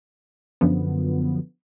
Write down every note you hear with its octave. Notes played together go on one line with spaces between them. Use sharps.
F#2 D3 F3 B3